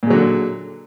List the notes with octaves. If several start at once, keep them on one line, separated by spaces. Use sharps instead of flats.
A#2 D3 F#3 G#3